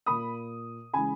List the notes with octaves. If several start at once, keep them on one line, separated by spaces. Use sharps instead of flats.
A#2 A#3 B5 D#6
C#3 E3 G#3 G#5 B5